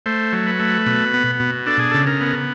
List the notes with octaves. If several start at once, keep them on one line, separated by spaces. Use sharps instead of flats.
A3 C5
F#3
B4
A3
B2
B3
B2
D4 A4
G#4
C#3 A4
A#4
B3